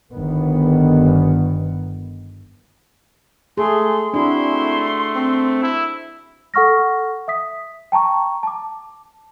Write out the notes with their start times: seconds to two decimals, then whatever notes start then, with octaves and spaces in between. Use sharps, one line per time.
0.13 G1 D#3 B3
3.58 A3 G#4 C6
4.14 C4 D4 E4 F#4 C6
4.52 A3
5.15 C4
5.63 E4
6.54 A4 F#5 C#6 F6 A#6
7.28 E5 D#6 B6
7.92 G5 A5 A#5 C#6
8.43 A5 D6